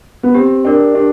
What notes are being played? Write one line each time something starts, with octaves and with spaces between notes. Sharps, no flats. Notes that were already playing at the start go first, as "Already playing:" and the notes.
B3
C4 G4
D4 A#4 D5 G5
D4 G4